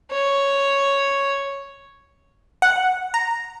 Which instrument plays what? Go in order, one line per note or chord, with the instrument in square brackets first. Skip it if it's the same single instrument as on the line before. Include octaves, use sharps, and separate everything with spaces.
[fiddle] C#5
[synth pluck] F#5
A#5